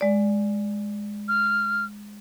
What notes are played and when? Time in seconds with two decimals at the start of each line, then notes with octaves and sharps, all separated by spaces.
0.01 G#3 D5
1.28 F6